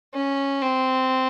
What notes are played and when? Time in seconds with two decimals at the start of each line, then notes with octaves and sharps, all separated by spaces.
0.14 C#4
0.62 C4